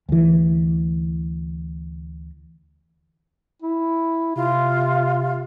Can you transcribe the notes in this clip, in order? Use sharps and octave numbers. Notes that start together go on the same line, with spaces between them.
D2 E3
E4
C3 F4